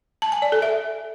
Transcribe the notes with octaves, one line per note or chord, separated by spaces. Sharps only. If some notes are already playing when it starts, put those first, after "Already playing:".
A5
G#5
D5
A4
E5